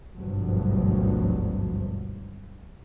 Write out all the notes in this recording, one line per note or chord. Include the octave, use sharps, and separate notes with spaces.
G#1 D2 G2 B2 F3 F#3